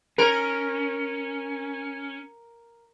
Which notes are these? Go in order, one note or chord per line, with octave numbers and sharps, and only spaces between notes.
C#4 A#4